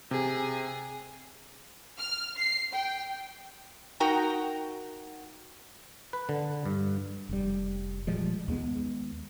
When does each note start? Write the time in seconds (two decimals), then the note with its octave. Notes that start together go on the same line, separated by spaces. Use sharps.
0.11 C3 G#4
1.99 F6
2.38 C7
2.73 G5
4.00 D#4 F#4 A#4 G5 A#5
6.13 B4
6.29 D3
6.66 G2
7.29 F1 G3
8.07 A#2 F3 G3 G#3
8.48 D#2 G#3 B3